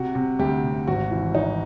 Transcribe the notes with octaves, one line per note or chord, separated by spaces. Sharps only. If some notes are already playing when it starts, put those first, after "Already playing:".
Already playing: C3 F#4
C3
D2 G4
C3
G#1 F#4
E3
E3 D#4